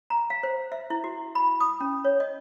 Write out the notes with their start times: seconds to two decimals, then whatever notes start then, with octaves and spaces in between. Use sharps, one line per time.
0.10 A#5
0.30 F5
0.43 C5
0.72 E5
0.90 E4
1.04 F#4
1.35 B5
1.60 D#6
1.80 C#4
2.05 C#5
2.20 D#5